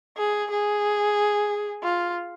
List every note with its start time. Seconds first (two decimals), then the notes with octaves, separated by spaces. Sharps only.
0.17 G#4
0.50 G#4
1.83 F4